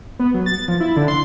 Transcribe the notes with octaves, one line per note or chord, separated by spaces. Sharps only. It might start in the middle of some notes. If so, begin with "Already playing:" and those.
B3
F#3
A6
F3
E4
D3
C6